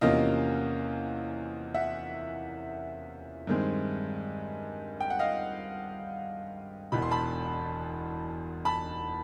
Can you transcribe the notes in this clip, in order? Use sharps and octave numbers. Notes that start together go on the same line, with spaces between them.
E2 C3 F3 A#3 C#4 D#5 F5
E5 F#5
G2 D#3 G#3 C4
G5
F#5
D#5 F5
E1 E2 B2 B5
C6
A5 B5
A5 B5